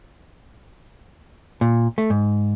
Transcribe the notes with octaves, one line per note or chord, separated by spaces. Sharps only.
A#2
A3
G#2